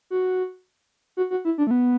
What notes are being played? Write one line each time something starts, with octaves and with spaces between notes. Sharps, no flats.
F#4
F#4
F#4
E4
D4
A3
B3